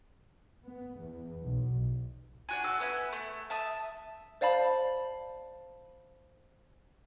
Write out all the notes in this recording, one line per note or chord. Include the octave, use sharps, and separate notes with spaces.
B3
E2
B1
D4 F#4 G#5
F#4 A4 E6
B3 E5 G#5 B5
A3
E5 A5 D#6
C5 D5 F5 A5 B5